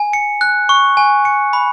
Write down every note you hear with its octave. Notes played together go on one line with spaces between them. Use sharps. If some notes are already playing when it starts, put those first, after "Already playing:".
Already playing: G#5
C#7
F#6
C#6
G#5
C#7
B5